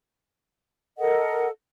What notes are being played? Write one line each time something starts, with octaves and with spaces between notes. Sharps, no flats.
A4 A#4 D#5 F#5